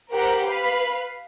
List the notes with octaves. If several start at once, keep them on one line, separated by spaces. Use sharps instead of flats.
G4 A#4 C5 F#5
B4 F5 B5